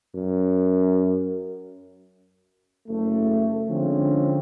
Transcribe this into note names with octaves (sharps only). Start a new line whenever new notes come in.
F#2
F#1 A3
D3 F3 G#3 C4 C#4